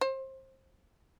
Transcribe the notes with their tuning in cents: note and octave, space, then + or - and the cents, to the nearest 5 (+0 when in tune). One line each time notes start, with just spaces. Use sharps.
C5 +25